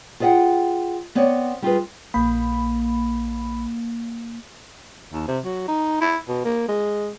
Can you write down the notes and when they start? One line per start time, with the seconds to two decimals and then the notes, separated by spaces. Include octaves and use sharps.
0.20 F4 G#4 D5 D#5 F#5 G5
1.15 B3 C4 C#5 D5
1.62 G3 F4 G#4 B4
2.14 A#1 A#3 B5
5.12 D#2
5.28 C3
5.45 F#3
5.68 D#4
6.01 E4
6.28 B2
6.45 A#3
6.68 G#3